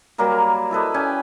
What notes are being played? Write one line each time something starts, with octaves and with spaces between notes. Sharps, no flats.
F#3 G3 A#3 A#4
E4 A4 B4 D#5
C#4 D5 G5 G#5